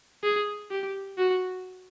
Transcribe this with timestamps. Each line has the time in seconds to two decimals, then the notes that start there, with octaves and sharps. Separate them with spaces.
0.23 G#4
0.70 G4
1.18 F#4